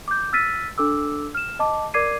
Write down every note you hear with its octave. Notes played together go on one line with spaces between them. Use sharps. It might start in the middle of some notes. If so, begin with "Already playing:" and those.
D6 G6
E6 F6 A6 B6 D#7
D4 A4 D6 E6
F6 E7
D#5 A5 D6
A#4 D5 D6 G#6 C7 D#7